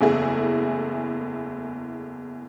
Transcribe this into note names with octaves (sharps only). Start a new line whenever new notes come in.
F#1 E2 A3 E4 G#4